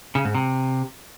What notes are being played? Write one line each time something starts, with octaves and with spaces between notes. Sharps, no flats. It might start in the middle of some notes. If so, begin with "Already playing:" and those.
C#3
G#2
C3